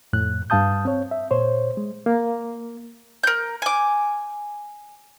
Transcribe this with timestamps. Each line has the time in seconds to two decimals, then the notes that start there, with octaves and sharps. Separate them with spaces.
0.13 F2 A2 F#6
0.50 G2 G3 F5 A5 D#6 G6
0.85 C4 C#5
1.11 E5
1.31 A#2 C5 C#5
1.77 G#3
2.06 A#3
3.23 A#4 G6
3.62 G#5 D6